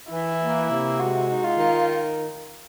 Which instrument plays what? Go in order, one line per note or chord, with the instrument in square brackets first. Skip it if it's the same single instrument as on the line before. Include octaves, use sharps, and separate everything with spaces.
[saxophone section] E3 [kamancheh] E4
[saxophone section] A#3
C3
[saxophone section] G#3 [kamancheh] F#4
[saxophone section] D#4
[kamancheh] F4
[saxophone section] D#3